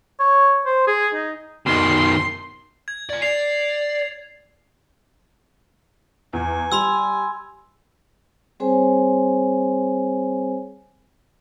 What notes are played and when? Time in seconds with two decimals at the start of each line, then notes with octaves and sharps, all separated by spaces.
0.20 C#5
0.66 C5
0.87 G#4
1.14 D#4
1.66 B2 D#3 C6
2.88 G#6
3.09 D5 G#5
3.22 D5 C7 F7
6.33 E2 G#5
6.72 G3 B5 C6 E6
8.60 G3 C4 G#4 C5 C#5 G#5